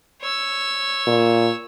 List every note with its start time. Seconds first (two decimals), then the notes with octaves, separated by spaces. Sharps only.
0.21 C#5 E6
1.07 A#2